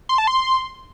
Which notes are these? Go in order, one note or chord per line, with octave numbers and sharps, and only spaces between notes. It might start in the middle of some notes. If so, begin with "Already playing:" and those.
C6
A5
C6